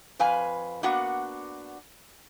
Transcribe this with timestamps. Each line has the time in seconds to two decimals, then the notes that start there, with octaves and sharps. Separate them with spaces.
0.19 F2 B4 F5 G#5
0.83 A#3 B3 D4 F#4 F#5